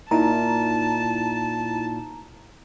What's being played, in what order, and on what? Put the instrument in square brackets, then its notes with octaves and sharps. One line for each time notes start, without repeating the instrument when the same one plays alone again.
[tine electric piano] A#2 [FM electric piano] D#4 E4 A#5 [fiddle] A5